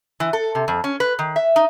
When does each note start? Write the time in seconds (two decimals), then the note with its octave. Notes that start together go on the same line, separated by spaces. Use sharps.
0.20 E3
0.33 A4
0.55 C3
0.68 F2
0.84 C#4
1.00 B4
1.19 D#3
1.36 E5
1.56 D#4